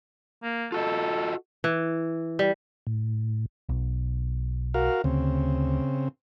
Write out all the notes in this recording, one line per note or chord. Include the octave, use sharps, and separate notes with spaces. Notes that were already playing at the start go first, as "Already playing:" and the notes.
A#3
F4 F#4 A4 D#5
E3
G3
A2
B1
F#4 A#4 F5
D2 C#3 C4